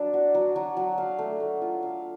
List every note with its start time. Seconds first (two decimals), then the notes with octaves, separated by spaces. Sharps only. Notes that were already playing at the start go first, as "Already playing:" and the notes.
Already playing: F#3 D4
0.14 F#4
0.34 F#3
0.56 F#3
0.77 F#3
0.98 F5
1.18 A3
1.40 A3
1.62 F4
1.83 F5